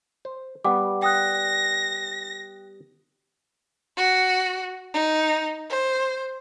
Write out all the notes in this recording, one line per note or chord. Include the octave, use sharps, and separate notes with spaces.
C5
G3 B3 F#5 D6
G5 D#6 F#6 A#6
F#4
D#4
C5